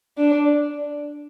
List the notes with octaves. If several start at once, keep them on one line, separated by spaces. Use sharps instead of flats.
D4